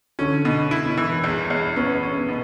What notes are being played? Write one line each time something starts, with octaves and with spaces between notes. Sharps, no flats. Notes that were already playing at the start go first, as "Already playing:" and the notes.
D3 C#4
B2
E4
E3
E2
E2
B3 C#4
C#4
B2